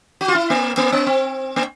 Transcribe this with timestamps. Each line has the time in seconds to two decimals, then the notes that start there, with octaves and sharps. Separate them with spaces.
0.21 F#4
0.28 F4
0.35 E4
0.50 A#3
0.77 A#3
0.92 B3
1.07 C4
1.56 A#3